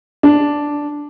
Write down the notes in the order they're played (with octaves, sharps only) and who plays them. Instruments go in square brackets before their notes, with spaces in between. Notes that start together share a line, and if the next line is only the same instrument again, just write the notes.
[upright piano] D4